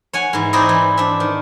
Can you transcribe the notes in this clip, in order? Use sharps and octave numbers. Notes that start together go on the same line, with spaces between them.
C#5 F#5 G#5
G#2 E3
C4 D#4 E4 G#4 D5 D#5
E3
D4 E5
D#3